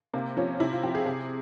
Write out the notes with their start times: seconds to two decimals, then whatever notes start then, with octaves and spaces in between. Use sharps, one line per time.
0.13 C3 A#3
0.37 F3 C#4
0.60 C3 E4
0.72 F4
0.83 F3 G4
0.95 G#4
1.06 C3